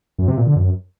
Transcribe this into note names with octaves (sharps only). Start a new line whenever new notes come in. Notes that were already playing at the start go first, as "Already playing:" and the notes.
F#2
C3
A#2
D3
F#2